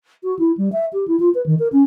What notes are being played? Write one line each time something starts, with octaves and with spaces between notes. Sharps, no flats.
F#4
E4
G3
E5
G4
E4
F4
B4
D#3
A#4
C#4